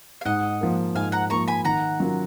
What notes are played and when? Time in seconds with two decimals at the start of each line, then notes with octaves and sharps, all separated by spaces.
0.21 F5
0.25 G#2 D#5 F#5
0.61 F3 A#3
0.95 G#2 F5 G#5
1.12 F#5 A#5
1.30 F3 A#3 A#5 C#6
1.48 G#5 B5
1.65 D#3 F#5 A#5
2.00 F#3 C#4 F4 A#4